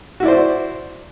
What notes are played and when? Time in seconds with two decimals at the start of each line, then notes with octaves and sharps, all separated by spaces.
0.20 F#4
0.23 E4
0.25 D5
0.28 C5